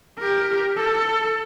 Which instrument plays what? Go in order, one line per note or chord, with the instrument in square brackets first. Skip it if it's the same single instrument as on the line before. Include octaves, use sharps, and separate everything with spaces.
[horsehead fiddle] G4 A#4
A4